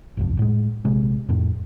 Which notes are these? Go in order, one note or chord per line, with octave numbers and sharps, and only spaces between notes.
G1 C2 F2
A2 G#3
A#1 C3 G#3
F2 A2